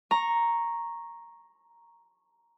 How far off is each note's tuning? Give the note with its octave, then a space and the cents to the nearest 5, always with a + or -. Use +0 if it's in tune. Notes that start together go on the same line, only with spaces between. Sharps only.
A#5 +0 C#6 -10